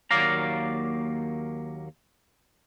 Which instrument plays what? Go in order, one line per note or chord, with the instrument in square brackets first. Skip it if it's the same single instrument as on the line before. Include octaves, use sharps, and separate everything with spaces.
[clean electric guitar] D#2 F#3 A#3 D5 F5 A#5